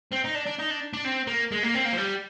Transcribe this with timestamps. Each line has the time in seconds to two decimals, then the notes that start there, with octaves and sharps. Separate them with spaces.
0.12 C4
0.24 D#4
0.34 D4
0.46 D4
0.59 D#4
0.70 D4
0.93 D4
1.05 C4
1.27 A#3
1.52 G#3
1.63 A#3
1.75 C4
1.85 A#3
1.93 F3
1.98 G3